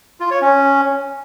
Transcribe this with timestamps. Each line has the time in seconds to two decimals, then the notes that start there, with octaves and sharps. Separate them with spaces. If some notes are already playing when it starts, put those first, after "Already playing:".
0.20 F4
0.31 C#5
0.42 C#4